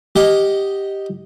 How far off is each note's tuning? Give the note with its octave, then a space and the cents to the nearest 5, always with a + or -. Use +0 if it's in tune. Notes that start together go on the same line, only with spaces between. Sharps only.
G4 +0 D#5 +0 F#5 +15